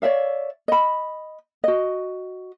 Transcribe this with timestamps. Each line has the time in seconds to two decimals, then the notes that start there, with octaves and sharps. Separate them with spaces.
0.02 C#5 D5 E5 F5
0.68 D#5 B5
1.64 F#4 D#5